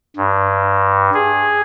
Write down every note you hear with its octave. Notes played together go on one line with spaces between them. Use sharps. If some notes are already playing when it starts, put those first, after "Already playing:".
G2
G#4